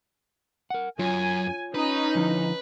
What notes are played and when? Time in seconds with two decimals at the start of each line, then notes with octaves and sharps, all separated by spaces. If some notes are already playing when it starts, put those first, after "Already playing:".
0.70 A#4 F#5
0.99 F#2 F4 C#5 G#5
1.75 C#4 D#4 B4
2.15 D3 F3 E4